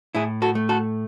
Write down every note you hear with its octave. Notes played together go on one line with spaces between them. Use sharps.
A2 E4 G#4
F#4 A4
A3
F#4 A4